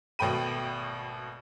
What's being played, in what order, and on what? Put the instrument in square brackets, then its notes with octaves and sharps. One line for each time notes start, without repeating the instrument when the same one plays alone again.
[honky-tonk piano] G#1 B2 A3 G5 B5 D#7